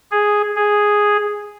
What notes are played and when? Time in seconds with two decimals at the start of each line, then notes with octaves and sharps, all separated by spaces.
0.11 G#4
0.56 G#4